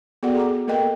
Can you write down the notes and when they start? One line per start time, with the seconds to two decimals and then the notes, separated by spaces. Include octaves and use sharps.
0.23 B3 F#4 G#4 A4 D5 F#5
0.35 G#4 A#5 D6
0.68 A#3 A4 A#4 D#5 G5